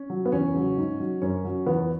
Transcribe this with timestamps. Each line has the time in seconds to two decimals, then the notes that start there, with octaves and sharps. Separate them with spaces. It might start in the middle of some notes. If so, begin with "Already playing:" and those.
Already playing: C#4
0.10 F#3
0.25 B3
0.32 E2 C#4
0.54 C#3 F#3
0.77 G#2
1.00 F#3
1.22 F#2 C#4
1.44 F#3
1.66 E2 B3